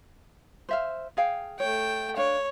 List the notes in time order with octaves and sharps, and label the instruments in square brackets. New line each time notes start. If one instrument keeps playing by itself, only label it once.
[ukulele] C5 E5 F5
G#4 F5 G5
[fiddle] A3 G5 [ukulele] C#5
[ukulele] D4 F5 [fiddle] C#5